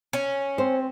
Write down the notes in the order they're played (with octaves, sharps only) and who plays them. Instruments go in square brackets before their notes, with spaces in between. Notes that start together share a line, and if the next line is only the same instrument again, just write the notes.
[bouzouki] C#4
[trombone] C4 [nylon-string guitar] C5